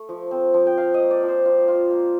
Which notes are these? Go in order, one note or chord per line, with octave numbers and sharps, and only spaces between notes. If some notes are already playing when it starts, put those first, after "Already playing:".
Already playing: A3
F3
C4
F3
G5
F3 F5
D#5
A#3
D5
F3
C5
F4
F4
A#3